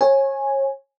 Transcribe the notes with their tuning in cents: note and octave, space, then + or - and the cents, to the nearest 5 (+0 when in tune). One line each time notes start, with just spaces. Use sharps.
C#5 -30 G#5 +0